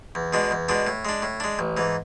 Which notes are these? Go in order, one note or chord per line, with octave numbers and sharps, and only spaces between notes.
E2
B2 G#3 D4
E2
B2 G#3 D4
A2
G#3 D4
A2
G#3 D4
A1
G#2 E3